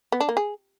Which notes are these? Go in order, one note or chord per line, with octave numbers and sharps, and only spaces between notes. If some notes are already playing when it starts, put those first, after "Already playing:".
B3
D4
A#3
G#4